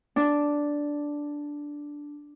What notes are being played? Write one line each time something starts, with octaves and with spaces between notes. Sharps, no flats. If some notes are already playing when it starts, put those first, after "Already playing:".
D4